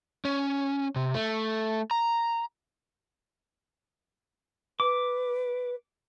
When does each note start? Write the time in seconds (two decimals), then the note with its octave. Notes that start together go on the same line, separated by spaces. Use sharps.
0.25 C#4
0.96 C3
1.14 A3
1.91 A#5
4.80 B4 D6